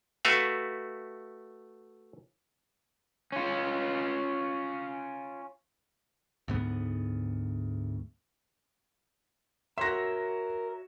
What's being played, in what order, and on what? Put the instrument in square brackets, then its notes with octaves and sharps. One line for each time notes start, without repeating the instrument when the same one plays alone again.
[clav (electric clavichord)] A3 F#4 B4 E5 F5
[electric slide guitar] C#4 F4
[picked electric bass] D2 G#2 B3
[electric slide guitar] F#4 C#5 E5 [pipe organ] A#4 [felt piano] C6 A#6